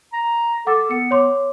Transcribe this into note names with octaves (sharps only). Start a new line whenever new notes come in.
A#5
A4 F#5 D6 A6
B3 C#7
C#5 C6 D6